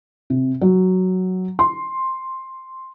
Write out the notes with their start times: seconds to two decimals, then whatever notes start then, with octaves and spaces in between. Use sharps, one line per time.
0.30 C3
0.61 F#3
1.59 C6